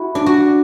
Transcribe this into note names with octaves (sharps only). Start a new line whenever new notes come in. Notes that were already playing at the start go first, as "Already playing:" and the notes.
Already playing: E4 F#4
D4
F#4